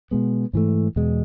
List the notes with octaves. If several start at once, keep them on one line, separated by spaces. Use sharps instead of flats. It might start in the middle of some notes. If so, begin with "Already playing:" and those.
B2 G#3 B3
G#2 E3 A3
E2 B2 G#3